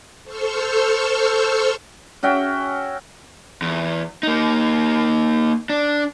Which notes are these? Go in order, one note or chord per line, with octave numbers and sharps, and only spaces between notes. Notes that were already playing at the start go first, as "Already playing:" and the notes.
A4 C5 C#6 E6 F6 G6
C#4 F#4 E5 G5
E2
A#3 D#4
D4